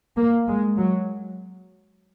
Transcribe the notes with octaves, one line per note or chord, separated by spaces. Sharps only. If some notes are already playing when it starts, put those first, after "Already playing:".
A#3
G#3
F#3